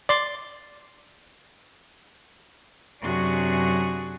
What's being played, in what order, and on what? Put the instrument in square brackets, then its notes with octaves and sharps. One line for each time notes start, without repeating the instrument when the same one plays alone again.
[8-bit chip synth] D5 C6 A6
[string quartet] F#2 C3 D4 F#4 G#4 C#6